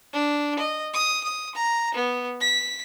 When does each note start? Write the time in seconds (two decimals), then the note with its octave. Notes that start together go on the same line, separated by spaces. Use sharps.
0.13 D4
0.59 D#5
0.94 D#6
1.24 D#6
1.55 A#5
1.94 B3
2.41 B6